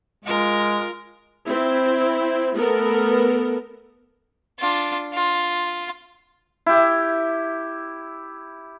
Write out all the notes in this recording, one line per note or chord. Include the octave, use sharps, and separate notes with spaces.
G#3 F4 A#4
C4 E4
A3 B3 A4 A#4
D4 F4
F4
E4 G4